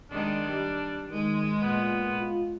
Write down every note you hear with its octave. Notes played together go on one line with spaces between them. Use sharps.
D#3 G#3 D4
G3
D#3 G#3
A#2 B3
F4